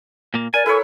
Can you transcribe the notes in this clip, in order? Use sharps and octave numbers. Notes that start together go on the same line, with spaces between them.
A#2 A#3
A#4 D5 G#5
E4 A4 B4 C#5